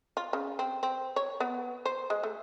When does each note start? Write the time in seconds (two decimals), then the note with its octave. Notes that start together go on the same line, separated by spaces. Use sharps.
0.17 F4
0.33 C#3
0.59 C4
0.83 C4
1.16 C#5
1.40 B3
1.85 C5
2.10 G#3
2.23 A3